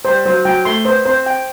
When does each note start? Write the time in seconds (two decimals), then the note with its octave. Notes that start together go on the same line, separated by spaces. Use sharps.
0.05 G3 C5
0.25 F#3 C5
0.45 F#3 G5
0.65 A3 C6
0.85 B3 C5
1.06 C4 C5
1.26 G5